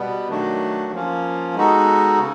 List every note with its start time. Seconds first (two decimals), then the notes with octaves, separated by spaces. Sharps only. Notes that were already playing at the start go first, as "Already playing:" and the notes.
Already playing: B2 G3 B3
0.28 D#3 F#3 A3 D4 F#4
0.92 F3 A#3 C#4 F4
1.55 G#3 B3 D#4 F#4 A4
2.19 C#3